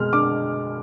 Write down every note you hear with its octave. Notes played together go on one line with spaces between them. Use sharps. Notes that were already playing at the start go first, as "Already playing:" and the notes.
Already playing: B2 G#3 B3 F6
D4 D6